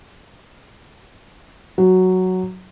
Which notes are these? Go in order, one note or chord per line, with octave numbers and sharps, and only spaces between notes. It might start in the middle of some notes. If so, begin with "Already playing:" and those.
F#3